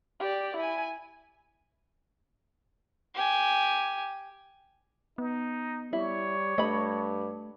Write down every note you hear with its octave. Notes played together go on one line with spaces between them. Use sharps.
G4 D5
E4 G#5
G4 G#5
B3 D#4
G3 E4 C#5
G2 A3 D#5 B5